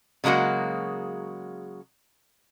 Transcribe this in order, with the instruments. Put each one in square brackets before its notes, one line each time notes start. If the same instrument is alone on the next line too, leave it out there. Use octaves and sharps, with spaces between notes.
[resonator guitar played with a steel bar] C#3 F#3 G#3 A#3 F#4